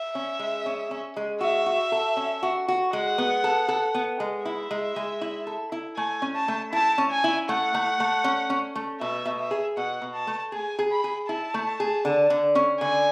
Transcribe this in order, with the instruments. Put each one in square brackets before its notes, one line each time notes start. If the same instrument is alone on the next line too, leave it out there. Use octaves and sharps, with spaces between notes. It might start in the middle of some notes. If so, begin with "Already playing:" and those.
Already playing: [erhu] E5
[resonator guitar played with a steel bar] C#4
G#3
C#4
C#4
G#3
[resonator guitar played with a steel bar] F#4 [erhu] E5
[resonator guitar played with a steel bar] F#4
A4
C#4
F#4
F#4
[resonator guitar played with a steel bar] G#3 [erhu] F#5
[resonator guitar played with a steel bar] B3
A4
A4
B3
G#3
[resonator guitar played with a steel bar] E4 [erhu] E5
[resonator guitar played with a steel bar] G#3
G#3
E4
A4
E4
[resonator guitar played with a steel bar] A3 [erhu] G#5
[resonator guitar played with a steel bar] C#4
[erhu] A5
[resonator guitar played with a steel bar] A3
[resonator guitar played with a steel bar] E4 [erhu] A5
[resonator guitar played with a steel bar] C#4
[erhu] G#5
[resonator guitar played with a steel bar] E4
[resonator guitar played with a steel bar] A3 [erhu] F#5
[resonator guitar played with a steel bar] A3
A3
C#4
C#4
A3
[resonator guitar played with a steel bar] B2 [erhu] E5
[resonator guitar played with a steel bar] B2
[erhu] E5
[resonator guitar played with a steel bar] G#4
[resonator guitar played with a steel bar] B2 [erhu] F#5
[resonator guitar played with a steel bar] B2
[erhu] A5
[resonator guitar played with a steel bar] A3
[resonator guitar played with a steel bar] G#4 [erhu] G#5
[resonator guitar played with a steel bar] G#4
[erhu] B5
[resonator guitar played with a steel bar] G#4
[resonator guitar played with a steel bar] E4 [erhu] A5
[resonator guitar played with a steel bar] A3
G#4
D3
D3
C#4
[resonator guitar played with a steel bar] D3 [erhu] G#5